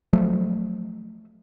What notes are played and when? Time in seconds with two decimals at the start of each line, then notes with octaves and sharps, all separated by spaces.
0.13 F3 F#3 A3